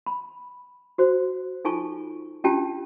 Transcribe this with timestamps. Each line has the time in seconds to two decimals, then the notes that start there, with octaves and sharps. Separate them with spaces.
0.06 B5
0.98 F#4 C5
1.65 D#4 F4 A4 G#5 A5 C#6
2.44 C#4 D4 F4 G4 G5 A5